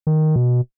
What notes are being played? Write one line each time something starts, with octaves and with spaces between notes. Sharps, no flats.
D#3
B2